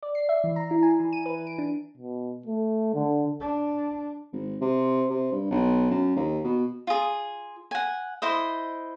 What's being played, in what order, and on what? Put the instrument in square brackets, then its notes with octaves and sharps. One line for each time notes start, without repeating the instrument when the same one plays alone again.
[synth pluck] D5
C7
E5
E3
A#5
E4
G#5
E3
D#7
B4
D7
D4
[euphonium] B2
A3
D3
[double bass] D4
[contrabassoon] G#1
C3
C3
G2
B1
F#2
D#2
B2
[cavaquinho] F4 G#4
F#5 G#5
E4 C5 D#5